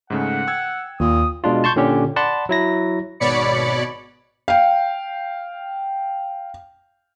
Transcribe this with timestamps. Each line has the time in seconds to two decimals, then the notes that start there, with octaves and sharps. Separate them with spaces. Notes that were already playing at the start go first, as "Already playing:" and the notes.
0.10 G#2 C#3 A3 F#5
0.47 G5 E6 G#6
1.00 D#2 A#2 D#6
1.44 B2 G#3 D4 F4
1.64 A5 C6 C#6 G6
1.76 A#2 D3 C#4 G4
2.16 D5 F#5 A5 B5 C6
2.49 F#3 E4 A#6
3.20 G#1 B2 C#5 D5 B5 C#7
4.48 F5 G5